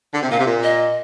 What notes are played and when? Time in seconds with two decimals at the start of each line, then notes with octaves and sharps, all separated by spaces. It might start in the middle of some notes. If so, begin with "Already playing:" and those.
0.14 D3
0.22 C3
0.31 A#2 F5
0.39 C3
0.46 A#2
0.63 D#5